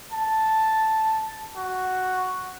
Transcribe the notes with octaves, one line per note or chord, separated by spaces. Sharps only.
A5
F#4